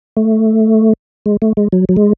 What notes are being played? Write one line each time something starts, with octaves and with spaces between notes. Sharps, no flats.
A3
G#3
A3
G#3
F#3
F#3
G#3